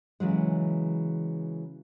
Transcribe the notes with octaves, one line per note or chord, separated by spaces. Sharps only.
C#3 E3 F#3 G#3